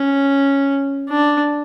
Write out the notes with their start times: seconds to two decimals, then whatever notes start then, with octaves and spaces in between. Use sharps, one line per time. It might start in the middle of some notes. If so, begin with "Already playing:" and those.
Already playing: C#4
1.10 D4